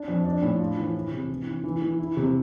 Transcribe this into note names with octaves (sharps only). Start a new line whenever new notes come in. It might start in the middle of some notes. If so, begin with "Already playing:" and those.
Already playing: D4
F2
D4
A2
F4
E3
E4
C3
E3
E3
E3
E3
E4
C3